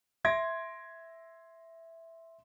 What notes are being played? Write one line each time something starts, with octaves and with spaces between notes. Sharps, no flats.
E5 C6 G#6 A#6 D7